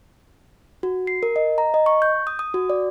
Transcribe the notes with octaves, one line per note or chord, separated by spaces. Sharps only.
F#4
C7
A#4
D#5
A#5
D#5
C#6
G6
D#6
D#6
F#4
D5